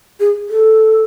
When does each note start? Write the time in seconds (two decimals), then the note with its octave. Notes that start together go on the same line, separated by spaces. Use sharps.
0.20 G#4
0.49 A4